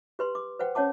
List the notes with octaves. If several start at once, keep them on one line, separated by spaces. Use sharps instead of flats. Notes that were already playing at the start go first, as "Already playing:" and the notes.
G4 B4 C6
D6
B4 C5 F#5 G5
C#4 C#5 F#5 A5 D6